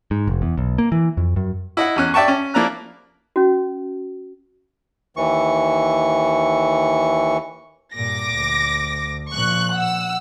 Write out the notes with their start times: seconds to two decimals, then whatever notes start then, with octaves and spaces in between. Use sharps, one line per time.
0.11 G#2
0.28 F1
0.42 E2
0.58 B1
0.78 A#3
0.92 E3
1.17 F2
1.36 F#2
1.77 E4 D#5 F#5
1.96 E2 C#4 F#6
2.14 D5 E5 G5 A5 C#6
2.28 C#4
2.54 F3 A#3 E4 D5 A#5 F#6
3.36 C#4 F#4
5.17 D#2 E3 C#6
7.94 G2 A#2 D6 A#6
8.33 D2
9.33 A#2 F3 C#6 F#6
9.75 F#5 E6